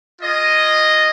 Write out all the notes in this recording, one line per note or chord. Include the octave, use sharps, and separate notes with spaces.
F4 G#4 D#5